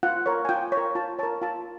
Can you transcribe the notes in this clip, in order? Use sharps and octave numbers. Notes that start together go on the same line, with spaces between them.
F4 F#5
A#4 C#5
G#5
F4 G5
C#5
A#4
F4 A5
A#4 C#5 A5
F4 A5